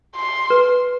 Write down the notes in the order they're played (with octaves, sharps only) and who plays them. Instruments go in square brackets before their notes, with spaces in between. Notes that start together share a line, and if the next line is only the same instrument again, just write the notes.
[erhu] C6
[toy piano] B4